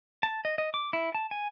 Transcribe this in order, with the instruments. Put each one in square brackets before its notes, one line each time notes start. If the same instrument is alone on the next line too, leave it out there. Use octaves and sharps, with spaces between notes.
[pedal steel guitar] A5
D#5
D#5
D6
E4
A5
G#5